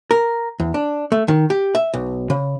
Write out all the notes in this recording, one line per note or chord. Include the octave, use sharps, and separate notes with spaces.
A#4
E2
D4
A3
D#3
G4
E5
B1
C#3